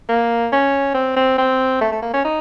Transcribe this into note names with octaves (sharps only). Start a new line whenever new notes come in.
A#3
C#4
C4
C4
C4
A3
A3
A#3
C#4
D#4